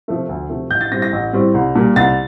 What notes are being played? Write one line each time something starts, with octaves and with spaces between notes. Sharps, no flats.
C3 F3 A3
D2
C3 F3 A3
A1 G6
A6
A2 G3 C4 A#6
A#6
A1
A2 G3 C4
C2
A#2 G3 A#3
C2 A6